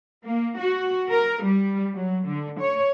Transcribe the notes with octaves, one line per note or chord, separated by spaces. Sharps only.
A#3
F#4
A#4
G3
F#3
D3
C#5